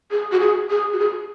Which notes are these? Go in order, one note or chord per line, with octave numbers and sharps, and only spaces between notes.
G#4
F#4
G#4
G#4
F#4
G#4